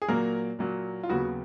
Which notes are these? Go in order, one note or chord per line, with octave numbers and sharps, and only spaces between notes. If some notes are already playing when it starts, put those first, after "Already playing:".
G#4
A#2 F#3 A#3 A#4
A#2 F#3 A#3
F4
D#2 C#3 F#3 B3 F#4